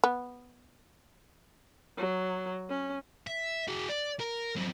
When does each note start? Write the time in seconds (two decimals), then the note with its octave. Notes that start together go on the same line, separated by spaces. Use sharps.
0.04 B3
1.97 F#3
2.69 C#4
3.27 E5
3.67 F#4 G#4
3.89 D5
4.20 A#4
4.57 F#2 C4